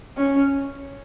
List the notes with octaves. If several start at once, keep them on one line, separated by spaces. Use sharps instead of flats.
C#4